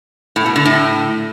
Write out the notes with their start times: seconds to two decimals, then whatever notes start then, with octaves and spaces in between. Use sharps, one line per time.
0.36 A2
0.46 B2
0.56 D3
0.65 A2